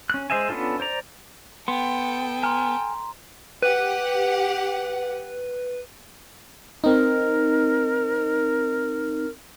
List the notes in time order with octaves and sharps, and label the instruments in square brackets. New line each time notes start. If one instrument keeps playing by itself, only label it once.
[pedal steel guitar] C#4 F#6
G#3 C5 D#5 E5 G#5
B3 C#4 D4 F4 A4
C5 D5 A#5
[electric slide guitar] B3 [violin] A4 G5 [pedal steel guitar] C6
[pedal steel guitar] G#5 F6 [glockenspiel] A#5 C6
[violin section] G4 F#5 [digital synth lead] B4
[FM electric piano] C4 D#4 [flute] A#4